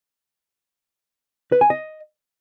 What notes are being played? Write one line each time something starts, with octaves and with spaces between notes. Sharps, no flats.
B4
G#5
D#5